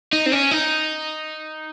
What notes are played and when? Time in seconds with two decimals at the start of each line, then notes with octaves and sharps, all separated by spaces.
0.13 D#4
0.26 C4
0.32 C#4
0.51 D#4